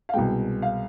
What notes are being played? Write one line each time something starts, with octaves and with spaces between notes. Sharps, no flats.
F5
C2 B2 G#3 G5
F5